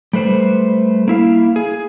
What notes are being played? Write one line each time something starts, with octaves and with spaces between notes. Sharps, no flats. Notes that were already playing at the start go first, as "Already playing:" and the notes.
G3 A3 B4 C5
A#3 E4 F5
G#4